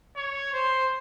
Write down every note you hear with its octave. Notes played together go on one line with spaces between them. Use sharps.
C#5
C5